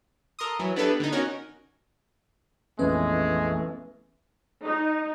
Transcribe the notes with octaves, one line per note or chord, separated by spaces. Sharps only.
A4 A#4 D#5 C6 D#6
E3 F#3
B3 D4 E4 G4 A4 B4
D3 B3 D#4
C#4 D#4 F#4 A#4 C#5
A#1 F2 E3 G#3 A3 B3 C#4 B4
D#4